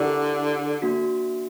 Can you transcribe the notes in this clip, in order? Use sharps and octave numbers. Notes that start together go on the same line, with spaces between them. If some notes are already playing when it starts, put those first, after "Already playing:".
Already playing: D3 E4 G4 A#4 D5 F#5
A#3 D4 F#4